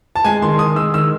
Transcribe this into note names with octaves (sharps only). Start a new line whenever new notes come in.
A5
G#3 G#5
D#3 C6
D#3 D#6
G#3 E6
D#3 E6